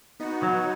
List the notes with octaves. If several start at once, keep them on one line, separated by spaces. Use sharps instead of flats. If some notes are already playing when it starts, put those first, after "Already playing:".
B3 D#4 F#4
F#3